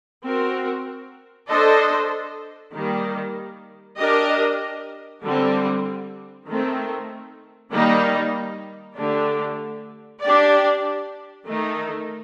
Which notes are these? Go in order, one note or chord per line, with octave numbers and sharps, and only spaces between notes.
C4 F#4 A#4
D4 A4 C5 D#5
D#3 G3 A#3
D4 G4 A#4 D#5
D3 G3 C4
D#3 A3 C4
D#3 G3 A#3 D#4
D3 A3 D4 G4
D4 G4 D5
D#3 A3 D#4